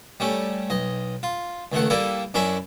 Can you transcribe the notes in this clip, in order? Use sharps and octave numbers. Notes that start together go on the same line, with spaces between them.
G3 A3 C#4
B1 D#5
F4
C#2 D#3 A3 F#5
G3 A#3 E4 A4
F#2 C#4 D4 E4 E5